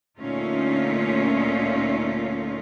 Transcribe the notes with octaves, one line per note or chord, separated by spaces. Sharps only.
D2 A#2 A3 C#4 D#4 F4